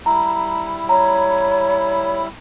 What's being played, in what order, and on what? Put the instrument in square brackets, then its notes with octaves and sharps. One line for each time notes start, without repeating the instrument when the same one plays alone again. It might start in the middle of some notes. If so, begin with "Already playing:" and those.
[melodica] G3 E4 [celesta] A#5
[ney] C#5 [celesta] A#5